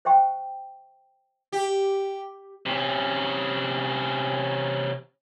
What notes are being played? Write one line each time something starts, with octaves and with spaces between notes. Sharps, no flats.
C5 E5 G5 C#6
G4
C3 C#4